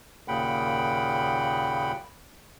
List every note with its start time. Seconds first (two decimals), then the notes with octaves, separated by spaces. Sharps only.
0.28 D#2 A#2 C#3 F#5 G5 B5